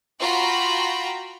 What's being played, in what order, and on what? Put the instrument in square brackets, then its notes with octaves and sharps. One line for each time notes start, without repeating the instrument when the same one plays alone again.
[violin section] F4 F#4 G5 A#5 B5